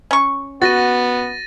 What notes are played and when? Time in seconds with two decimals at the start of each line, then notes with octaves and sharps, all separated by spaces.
0.11 C#4 C#6
0.62 B3 F#4 A6 A#6 D#7